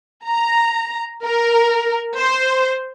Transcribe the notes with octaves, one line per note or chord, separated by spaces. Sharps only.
A#5
A#4
C5